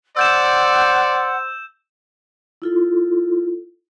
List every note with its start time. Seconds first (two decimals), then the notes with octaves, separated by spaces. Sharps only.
0.17 C5 D5 F#5 E6 G6 E7
2.62 E4 F4 A4